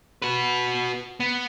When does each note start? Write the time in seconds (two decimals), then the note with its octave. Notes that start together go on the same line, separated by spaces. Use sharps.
0.22 F#4 B4
1.20 B3